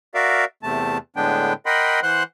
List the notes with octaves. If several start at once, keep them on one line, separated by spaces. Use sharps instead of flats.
F#4 A#4 D5 E5 F5
E2 C3 A3 A5
A2 D3 G#3 B3 D4 G5
A#4 D#5 F#5 G5 B5 C6
E3 C5 F#5 C6 F#6